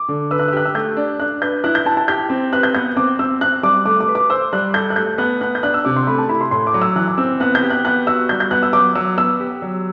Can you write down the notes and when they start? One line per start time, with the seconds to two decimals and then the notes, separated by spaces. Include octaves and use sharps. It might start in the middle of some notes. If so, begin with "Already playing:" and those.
Already playing: D6
0.09 D3
0.31 B4 E6
0.39 F#6
0.48 E6
0.52 G4 F#6
0.65 E6
0.75 A3 G6
0.97 D4
1.19 D4 F#6
1.42 B4 G6
1.64 E4 F#6
1.75 G6
1.86 E4 A5
1.97 A5
2.08 G4 G6
2.30 C4
2.53 B4 F#6
2.63 G6
2.75 B3 G6
2.96 C4 D6
3.19 C4 E6
3.41 C4 F#6
3.63 G3 D6
3.86 A3 D6
4.00 D6
4.08 B4
4.15 D6
4.30 C5 E6
4.53 G3 F#6
4.74 A4 G6
4.90 F#6
4.96 A3 G6
5.18 B3 F#6
5.41 B3 F#6
5.55 G6
5.63 D4 F#6
5.74 E6
5.85 C3 D6
5.96 C6
6.07 A3 B5
6.18 A5
6.29 E4 B5
6.41 C6
6.51 A2 C6
6.67 D6
6.74 F#3
6.82 E6
6.96 E3 F#6
7.08 D6
7.18 C4 E6
7.40 B3 F#6
7.55 G6
7.63 G4
7.70 F#6
7.85 B3 F#6
8.07 F#4 E6
8.29 G3 G6
8.40 G6
8.51 B3 F#6
8.63 E6
8.73 F#3 D6
8.95 F#3 E6
9.18 B3 E6
9.40 G4
9.62 F#3